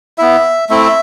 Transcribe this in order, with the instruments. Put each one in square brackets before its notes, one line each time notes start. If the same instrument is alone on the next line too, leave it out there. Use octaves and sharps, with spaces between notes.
[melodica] B3 E4 E5
A3 C4 E4 E5